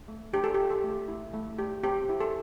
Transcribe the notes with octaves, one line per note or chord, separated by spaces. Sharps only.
A3
D4 G4
A4
F4 G4
A4
A3
E4
A3
G4
C4 G4
E4
A4